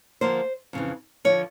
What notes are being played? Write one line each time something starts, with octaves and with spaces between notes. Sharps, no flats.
D3 F3 A#3 C5
F2 C#3 E3
D3 F3 C#5